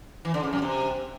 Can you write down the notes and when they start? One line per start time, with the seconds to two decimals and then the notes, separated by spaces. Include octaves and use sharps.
0.25 E3
0.34 D3
0.43 C#3
0.53 F#2
0.62 C3